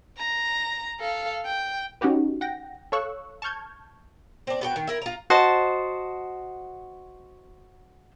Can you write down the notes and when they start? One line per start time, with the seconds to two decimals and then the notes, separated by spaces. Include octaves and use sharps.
0.18 A#5
1.00 A4 F5
1.46 G5
2.01 C#4 D#4 F#4 G4 B4
2.41 F#5 G5 A#6
2.92 A4 C#5 F5 C#6 E6 F#6
3.42 A5 C#6 F6 G6 G#6
4.47 C4 D4
4.61 B3 F#4 G5
4.76 D#3
4.87 E4 A#4
5.02 F4 A#5
5.30 F#4 C5 D#5 A5